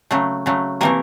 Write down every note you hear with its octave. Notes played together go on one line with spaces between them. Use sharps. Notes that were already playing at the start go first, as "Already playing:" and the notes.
C#3 F#3 A3
C#3 F#3 A3
C3 E3 A3 A#3 A#4